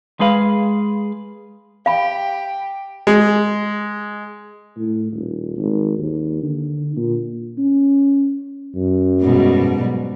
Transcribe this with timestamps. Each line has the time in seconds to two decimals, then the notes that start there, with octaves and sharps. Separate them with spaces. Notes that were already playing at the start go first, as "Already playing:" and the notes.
0.20 G#3 G#4 B4 F5
1.86 G4 F5 B5
3.07 G#3
4.77 A2
5.12 D#1
5.57 G#1
5.98 D#2
6.43 D3
6.96 A#2
7.58 C#4
8.75 F#2
9.22 G#2 B2 G3